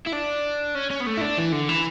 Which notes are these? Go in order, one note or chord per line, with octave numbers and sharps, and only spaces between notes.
E4
D4
C#4
C#4
B3
A3
E4
D4
E3
D3
E3